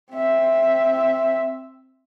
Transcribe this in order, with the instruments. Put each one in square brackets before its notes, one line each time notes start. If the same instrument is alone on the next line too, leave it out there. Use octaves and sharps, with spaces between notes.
[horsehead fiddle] C4 E5